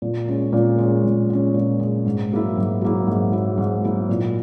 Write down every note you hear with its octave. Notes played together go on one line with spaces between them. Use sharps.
A#2
G#3 C#4
A#2
G#3 C#4
A#2
G#3 C#4
A#2
G#3 C#4
G#2
F#3 A#3 E4
G#2
F#3 A#3 E4
G#2
F#3 A#3 E4
G#2
F#3 A#3 E4
A#2